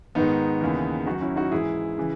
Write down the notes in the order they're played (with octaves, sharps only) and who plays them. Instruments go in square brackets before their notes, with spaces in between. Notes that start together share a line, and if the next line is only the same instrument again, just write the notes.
[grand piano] G#2 D#3 B3 D#4
D#2 C#3 E3
F#2 D#3 D#4 F#4
C#4 E4
D#4 F#4
G#2 E3 E4 G#4
C#3 E3